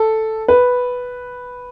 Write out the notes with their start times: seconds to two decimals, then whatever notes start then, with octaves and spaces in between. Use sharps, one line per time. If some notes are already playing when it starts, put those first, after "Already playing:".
Already playing: A4
0.48 B4